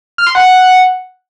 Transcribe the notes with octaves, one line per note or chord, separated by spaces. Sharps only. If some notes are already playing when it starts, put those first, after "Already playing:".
F6
C6
F#5